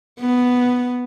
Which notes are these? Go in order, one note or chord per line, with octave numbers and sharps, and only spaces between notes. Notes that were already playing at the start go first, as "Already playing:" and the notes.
B3